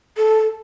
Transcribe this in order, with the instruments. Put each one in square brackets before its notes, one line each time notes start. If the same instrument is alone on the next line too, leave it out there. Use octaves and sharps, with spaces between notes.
[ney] A4